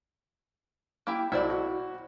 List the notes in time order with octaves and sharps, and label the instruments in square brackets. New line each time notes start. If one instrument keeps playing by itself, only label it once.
[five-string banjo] A#3 E4 G4
[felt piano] B1 [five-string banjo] E4 C5 D5
[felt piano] F#4